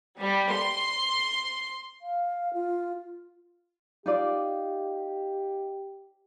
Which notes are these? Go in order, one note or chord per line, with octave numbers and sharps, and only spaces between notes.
G3
C6
F5
F4
D#4 F4 G4 D5